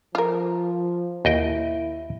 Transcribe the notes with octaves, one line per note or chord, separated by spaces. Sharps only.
F3 F4 A#4
D#2 E4 D#5 G5